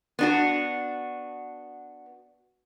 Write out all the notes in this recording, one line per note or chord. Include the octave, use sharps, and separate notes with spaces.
B3 D4 F#4